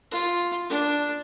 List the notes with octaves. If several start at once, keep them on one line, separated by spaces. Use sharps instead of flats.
F4
D4